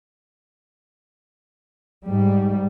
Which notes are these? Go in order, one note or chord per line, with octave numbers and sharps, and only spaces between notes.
G#2 G3